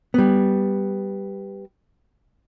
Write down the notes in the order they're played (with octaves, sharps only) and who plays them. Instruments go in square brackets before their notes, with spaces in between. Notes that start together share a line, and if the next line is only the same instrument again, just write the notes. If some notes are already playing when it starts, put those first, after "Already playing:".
[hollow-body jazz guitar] G3 B3